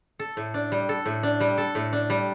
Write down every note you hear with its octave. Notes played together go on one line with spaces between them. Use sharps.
A4
A2
D4
G3
A4
A2
D4
G3
A4
A2
D4
G3